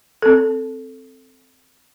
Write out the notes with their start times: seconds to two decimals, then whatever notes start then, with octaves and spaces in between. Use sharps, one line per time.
0.22 C4 A4